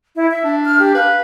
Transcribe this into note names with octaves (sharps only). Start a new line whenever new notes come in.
E4
E5
D4
F6
G4
B4 F5